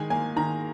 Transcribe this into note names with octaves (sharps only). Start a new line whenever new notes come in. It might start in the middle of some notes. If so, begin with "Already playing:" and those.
Already playing: D#3 G#3 G#5
A#3 G#5
D#3 A#5